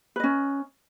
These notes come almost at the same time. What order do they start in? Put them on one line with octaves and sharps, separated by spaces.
B4 D#5 C#4